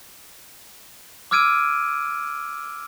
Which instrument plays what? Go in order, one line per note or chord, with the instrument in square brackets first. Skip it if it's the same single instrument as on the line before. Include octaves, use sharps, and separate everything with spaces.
[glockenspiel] D6 E6 F6 G#6 D7 D#7